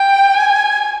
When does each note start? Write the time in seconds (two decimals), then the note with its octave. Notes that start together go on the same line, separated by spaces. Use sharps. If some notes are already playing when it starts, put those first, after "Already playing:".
Already playing: G5
0.35 G#5